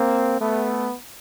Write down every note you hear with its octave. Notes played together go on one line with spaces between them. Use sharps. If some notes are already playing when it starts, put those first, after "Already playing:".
Already playing: A#3 C4
A3 B3